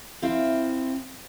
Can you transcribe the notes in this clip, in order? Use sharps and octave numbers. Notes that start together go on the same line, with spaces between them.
C4 E4 C5 F5